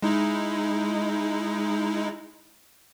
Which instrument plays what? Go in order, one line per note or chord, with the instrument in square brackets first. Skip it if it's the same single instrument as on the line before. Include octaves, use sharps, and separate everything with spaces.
[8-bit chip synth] G#3 D#4 E4